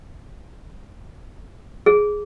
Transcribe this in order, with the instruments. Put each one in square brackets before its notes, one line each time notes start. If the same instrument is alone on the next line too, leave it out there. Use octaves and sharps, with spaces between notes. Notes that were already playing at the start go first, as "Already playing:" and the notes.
[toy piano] G#4